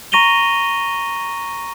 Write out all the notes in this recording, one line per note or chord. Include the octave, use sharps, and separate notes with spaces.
A#5 C#6 A#6 D#7 F7 G7